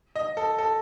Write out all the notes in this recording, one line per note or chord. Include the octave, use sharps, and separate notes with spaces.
D#5
A4
A4